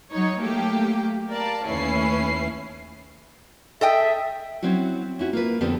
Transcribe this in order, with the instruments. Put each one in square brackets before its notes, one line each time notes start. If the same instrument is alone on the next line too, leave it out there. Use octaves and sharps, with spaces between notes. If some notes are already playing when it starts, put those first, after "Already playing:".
[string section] F#3 D#4 C#5
F#3 A3 A#3 G4
A#4 D5 F5 A5
D#2 A3 C#4 E4 B4 C7
[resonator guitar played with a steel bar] A4 D#5 G5 [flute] E5
[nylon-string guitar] F#3 C4 C#4 E4 F#4
C#4 E4 F#4
A#3 F4 B4
F2 D3 B3 C4 D4 G4